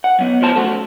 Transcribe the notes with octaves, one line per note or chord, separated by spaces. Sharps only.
F#5
F#3 B3
D2 F3 C5 A5
F#2 A3 F#4